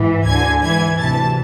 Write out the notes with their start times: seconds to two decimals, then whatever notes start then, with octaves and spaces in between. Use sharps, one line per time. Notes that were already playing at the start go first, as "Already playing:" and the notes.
Already playing: G#2 E3
0.26 D2 D3 G#5 G#6
0.63 G#2 E3 G#5 G#6
0.99 D2 C3 E3 A5 A6